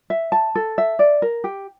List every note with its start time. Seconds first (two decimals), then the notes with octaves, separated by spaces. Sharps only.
0.10 E5
0.32 A5
0.55 A4
0.78 E5
0.99 D5
1.22 A#4
1.44 G4